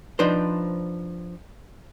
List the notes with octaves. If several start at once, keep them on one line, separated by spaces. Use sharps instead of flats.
F3 D4 D#4 B4 C5